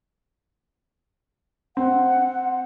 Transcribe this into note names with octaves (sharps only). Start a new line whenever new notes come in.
C4 F#5